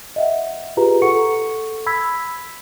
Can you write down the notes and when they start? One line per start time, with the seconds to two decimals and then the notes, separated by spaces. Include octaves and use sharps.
0.16 D#5 E5 F#5
0.77 F4 G4 G#4 B4 A#5
1.02 A4 F#5 C#6 C#7
1.86 B5 E6 G#6 B6